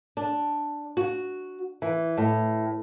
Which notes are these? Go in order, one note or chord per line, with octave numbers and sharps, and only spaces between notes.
D4
F#4
E3
A2